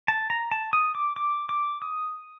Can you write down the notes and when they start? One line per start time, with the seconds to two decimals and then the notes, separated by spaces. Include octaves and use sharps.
0.08 A5
0.30 A#5
0.51 A5
0.73 D#6
0.95 D6
1.16 D6
1.49 D6
1.82 D#6